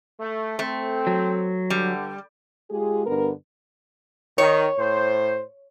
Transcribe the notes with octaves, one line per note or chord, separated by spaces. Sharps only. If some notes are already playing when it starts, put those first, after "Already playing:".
A3
A3 C4
F#3
G2 D3 G3
G#3 F4 G4 G#4
G2 D3 B3 A#4
D#3 C#5
A2 C5